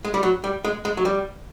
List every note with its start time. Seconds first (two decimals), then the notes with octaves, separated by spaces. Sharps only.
0.05 G#3
0.14 G3
0.23 F#3
0.44 G3
0.65 G#3
0.85 G#3
0.97 F#3
1.05 G3